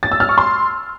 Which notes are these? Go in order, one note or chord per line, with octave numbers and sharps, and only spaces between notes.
A6
E6
F6
C#6
C6